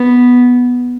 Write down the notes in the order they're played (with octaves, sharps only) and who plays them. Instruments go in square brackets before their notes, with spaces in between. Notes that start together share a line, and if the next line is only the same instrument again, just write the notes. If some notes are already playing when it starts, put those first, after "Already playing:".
Already playing: [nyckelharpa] B3